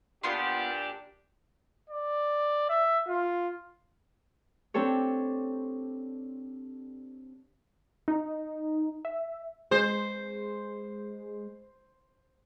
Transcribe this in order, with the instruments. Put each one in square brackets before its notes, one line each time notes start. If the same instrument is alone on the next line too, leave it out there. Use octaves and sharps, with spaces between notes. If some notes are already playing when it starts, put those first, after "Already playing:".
[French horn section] A#2 D4 G4 [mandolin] B3 F4 C6
[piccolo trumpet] D5
E5
F4
[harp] C4 D4 G4 A4 C#5
[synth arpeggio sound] D#4
E5
[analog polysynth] G#3 [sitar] C5